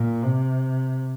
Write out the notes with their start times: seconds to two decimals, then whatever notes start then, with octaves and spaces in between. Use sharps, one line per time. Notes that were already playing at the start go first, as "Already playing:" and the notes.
Already playing: A#2
0.23 C3